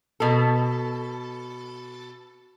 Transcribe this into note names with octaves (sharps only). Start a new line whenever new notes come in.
B2 A4